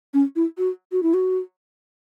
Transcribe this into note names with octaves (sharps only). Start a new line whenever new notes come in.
C#4
E4
F#4
F#4
E4
F#4